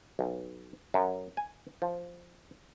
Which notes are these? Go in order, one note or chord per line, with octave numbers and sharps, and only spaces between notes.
B1
F#2
G#5
F3